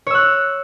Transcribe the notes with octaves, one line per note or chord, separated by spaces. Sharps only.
C#5 E6 F#6